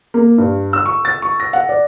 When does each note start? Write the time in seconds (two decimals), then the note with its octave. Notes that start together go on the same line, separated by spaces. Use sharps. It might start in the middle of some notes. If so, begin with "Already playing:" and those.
0.14 A#3
0.38 G2
0.73 E6
0.86 C#6
1.05 A6
1.22 C#6
1.40 A#6
1.53 F#5
1.69 D5